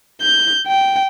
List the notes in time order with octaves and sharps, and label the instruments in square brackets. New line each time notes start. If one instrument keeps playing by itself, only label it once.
[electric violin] G6
G5